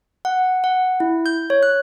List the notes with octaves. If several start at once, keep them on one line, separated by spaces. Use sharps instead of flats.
F#5
F#5
E4
G6
C#5
F#6